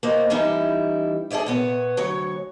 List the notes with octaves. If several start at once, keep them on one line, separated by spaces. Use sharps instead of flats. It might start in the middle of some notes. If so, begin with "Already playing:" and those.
A#3 F#4 C5 D#5
E3 G3 C#4 D#4 E4
G#4 A4 C#5 D5 E5
A#2 B3 C#5
D2 F#3 C#5